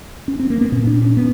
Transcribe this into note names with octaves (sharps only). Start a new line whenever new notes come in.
C#4
C4
A#3
B3
A#2 C#4
D4
C#4
B3